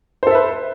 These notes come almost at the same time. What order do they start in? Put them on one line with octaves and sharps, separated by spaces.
C5 A4 E5 B4